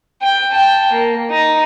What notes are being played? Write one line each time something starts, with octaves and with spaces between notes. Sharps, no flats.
G5
G5 A5
A#3
D#4